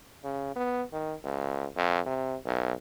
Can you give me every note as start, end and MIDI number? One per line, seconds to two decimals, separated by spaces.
0.24 0.55 49
0.56 0.83 59
0.93 1.14 51
1.24 1.68 37
1.77 2.00 41
2.06 2.37 48
2.45 2.74 35